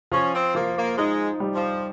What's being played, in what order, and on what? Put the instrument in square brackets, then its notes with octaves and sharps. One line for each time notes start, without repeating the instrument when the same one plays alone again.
[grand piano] F3 [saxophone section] C#4
[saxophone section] C4
[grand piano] F3 [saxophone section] A#3
[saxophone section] A#3
[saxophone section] G#3 [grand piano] D#4
[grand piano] G3
[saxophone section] F3